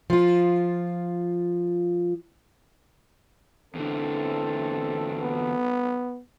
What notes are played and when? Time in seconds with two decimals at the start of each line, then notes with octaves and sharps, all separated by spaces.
0.10 F3 F4
3.75 E2 D3 E3 C4 A4
5.22 B3